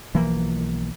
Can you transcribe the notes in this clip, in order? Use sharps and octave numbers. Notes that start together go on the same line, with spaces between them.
B1 E3 F3 A#3